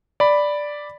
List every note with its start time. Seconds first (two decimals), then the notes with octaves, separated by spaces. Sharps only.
0.20 D5 B5